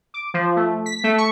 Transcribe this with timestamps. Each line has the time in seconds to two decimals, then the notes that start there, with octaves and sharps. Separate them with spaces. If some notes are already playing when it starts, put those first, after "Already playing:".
0.14 D6
0.34 F3
0.56 A3
0.86 B6
1.04 A3
1.18 C#6